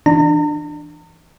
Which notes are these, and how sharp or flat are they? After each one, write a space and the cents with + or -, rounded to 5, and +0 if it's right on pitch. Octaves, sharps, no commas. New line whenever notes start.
E3 +0 D4 +20 A#5 -45